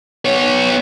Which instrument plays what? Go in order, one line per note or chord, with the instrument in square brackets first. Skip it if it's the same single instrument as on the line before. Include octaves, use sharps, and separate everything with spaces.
[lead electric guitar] B3 C#5